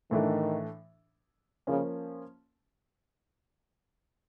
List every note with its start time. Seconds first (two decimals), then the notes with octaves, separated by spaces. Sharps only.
0.11 A2 D#3 E3 A3 D4
1.67 C#3 F3 A#3 C#4